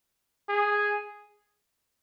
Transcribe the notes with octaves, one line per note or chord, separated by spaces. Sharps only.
G#4